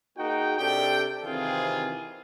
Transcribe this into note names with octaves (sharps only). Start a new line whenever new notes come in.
A#3 D#4 F#4 G#4 G5
C3 D4 G4 A4 G5
C3 D#3 E3 C4 F4 G#4